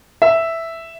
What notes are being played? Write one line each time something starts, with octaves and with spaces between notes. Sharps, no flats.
E5